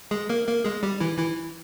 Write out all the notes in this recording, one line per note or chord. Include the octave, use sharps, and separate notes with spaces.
G#3 G#4
A#3 A#4
A#3 A#4
G#3 G#4
G3 G4
E3 E4
E3 E4